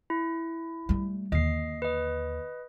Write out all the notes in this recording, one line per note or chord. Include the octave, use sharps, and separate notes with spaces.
E4
G3 A3
D#2 D3 D#5 C7
B4 D#5